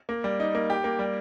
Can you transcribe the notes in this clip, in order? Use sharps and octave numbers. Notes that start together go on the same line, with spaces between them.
A#3
G3
D#4
A#3
G4
A#3
G3